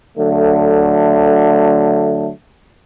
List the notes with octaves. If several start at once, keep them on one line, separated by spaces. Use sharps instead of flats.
D3 F#3 A3